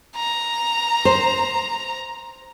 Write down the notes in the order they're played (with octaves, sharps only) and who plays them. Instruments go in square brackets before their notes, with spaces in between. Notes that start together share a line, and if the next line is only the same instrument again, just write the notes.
[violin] A#5
[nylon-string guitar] C5